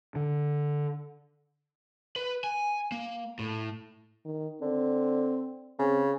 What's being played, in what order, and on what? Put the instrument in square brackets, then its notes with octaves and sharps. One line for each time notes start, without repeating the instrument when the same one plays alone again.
[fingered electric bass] D3
[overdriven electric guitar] B4
G#5
A#3
A2
[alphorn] D#3
[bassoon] D3 [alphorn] C4
[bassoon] C#3 [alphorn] C4